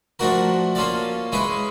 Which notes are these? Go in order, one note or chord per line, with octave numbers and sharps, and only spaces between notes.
F3 A3 D4 F#4 A#4
A#3 C#4 F4 A4 D5
G#3 C#4 E4 G#4 B4